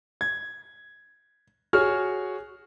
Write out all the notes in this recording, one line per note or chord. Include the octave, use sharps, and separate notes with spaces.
G#6
F#4 G#4 C#5 F6